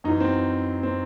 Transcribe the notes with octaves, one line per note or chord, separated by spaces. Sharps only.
F#2 E3 D#4
C4
C4